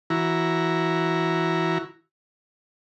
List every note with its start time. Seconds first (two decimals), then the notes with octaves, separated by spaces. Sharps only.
0.10 E3 E4 F#4 A#5